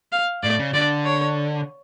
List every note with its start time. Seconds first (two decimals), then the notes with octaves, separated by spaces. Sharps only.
0.12 F5
0.43 A2 D5
0.59 C#3
0.74 D3 D5
1.05 C#5